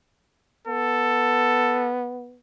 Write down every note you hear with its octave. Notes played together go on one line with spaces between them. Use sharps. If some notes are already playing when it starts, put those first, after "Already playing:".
B3 A4